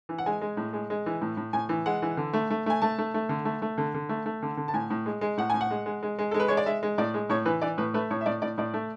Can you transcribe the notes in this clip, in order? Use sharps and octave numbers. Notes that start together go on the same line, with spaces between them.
E3
F#5
G#3 G#5
G#3
A2
G#3
G#3
E3
A2
A2
A2 G#5
E3
G#3 F#5
E3
D3
A3
A3
A3 G#5
A3 A5
A3
A3
D3
A3
A3
D3
D3
A3
A3
D3
D3
A5
A2 G#5
A2
G#3
G#3
A2 F#5
A2 G#5
F#5
G#3
G#3
G#3
G#3
G#3 A4
B4
G#3 C#5
D5
G#3 E5
G#3
A2 D5
G#3
A2 C#5
E3 B4
E3 D5
A2 B4
A3 B4
A2 C#5
E5
A2 D5
A2 D5
A2 D5
A3